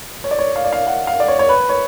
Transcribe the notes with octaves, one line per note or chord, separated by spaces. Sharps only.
C#5
D5
C#5
F5
D5
F5
F#5
F5
D5
C#5
C#5
B4
C#5